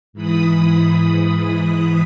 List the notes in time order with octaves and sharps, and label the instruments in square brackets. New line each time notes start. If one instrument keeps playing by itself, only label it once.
[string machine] G#2 E3 B5 D#6